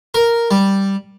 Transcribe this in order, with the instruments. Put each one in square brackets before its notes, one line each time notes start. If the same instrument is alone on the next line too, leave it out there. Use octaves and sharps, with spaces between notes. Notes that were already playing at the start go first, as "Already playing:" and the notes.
[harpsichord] A#4
G3